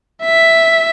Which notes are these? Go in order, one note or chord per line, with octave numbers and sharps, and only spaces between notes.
E5 B6